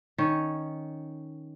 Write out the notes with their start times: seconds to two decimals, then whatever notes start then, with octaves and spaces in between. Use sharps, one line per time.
0.18 D#3 C#4 C#5